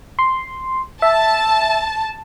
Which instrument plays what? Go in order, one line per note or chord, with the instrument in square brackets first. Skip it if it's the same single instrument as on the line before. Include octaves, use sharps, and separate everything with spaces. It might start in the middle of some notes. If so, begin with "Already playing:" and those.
[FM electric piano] C6
[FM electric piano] E5 [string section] A5